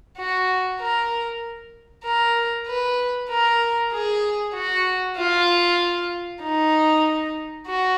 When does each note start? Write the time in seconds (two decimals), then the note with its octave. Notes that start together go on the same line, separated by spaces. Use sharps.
0.18 F#4
0.80 A#4
2.04 A#4
2.67 B4
3.30 A#4
3.92 G#4
4.54 F#4
5.17 F4
6.43 D#4
7.67 F#4